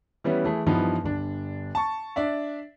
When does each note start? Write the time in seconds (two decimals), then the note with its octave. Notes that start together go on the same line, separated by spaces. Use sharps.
0.24 E3 G3 B3 C#4 E4
0.44 E3 A3 G#4
0.66 G2 E3 F3 B3 D#4
1.04 G1 D4
1.75 A5 C#6
2.16 D4 D5 E5